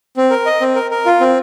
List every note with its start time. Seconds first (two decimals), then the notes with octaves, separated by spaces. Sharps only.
0.17 C4
0.30 A#4
0.46 D#5
0.61 C4
0.75 A#4
0.91 A#4
1.06 F4
1.21 C4